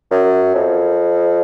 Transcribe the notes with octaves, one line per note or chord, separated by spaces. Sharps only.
F#2
F2